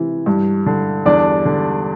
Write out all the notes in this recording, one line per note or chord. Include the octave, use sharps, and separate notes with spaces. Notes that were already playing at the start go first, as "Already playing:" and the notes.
Already playing: C3 E3
G2
D3
E2 D4 D5
D3